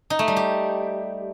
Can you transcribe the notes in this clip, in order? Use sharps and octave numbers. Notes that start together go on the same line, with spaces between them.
D#4
A3
G3
G4